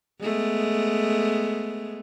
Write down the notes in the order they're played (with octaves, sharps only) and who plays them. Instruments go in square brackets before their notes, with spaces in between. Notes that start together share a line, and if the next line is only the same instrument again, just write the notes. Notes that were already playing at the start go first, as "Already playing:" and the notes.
[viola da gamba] G#3 A3 B3